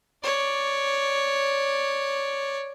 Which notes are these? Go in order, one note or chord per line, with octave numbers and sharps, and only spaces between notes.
C#5 D5